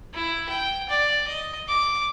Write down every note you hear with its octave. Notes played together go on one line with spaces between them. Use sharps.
E4
G5
D5
D#5
D6